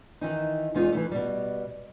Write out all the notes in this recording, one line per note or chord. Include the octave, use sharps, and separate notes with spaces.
D#3 E3 D#4
E2 G#3 D#4 F4
E3 F#3 A3
B2 G3